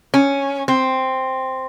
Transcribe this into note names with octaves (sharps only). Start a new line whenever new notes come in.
C#4
C4